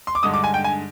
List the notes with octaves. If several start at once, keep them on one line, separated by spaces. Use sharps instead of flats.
C6
D6
G2 D3 G#3 D#4 D#6
D6
G#5
G5
G#5